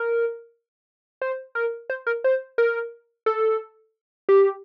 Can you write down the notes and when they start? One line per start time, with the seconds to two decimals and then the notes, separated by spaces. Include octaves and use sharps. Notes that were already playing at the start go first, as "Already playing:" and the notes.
Already playing: A#4
1.22 C5
1.55 A#4
1.90 C5
2.07 A#4
2.24 C5
2.58 A#4
3.26 A4
4.29 G4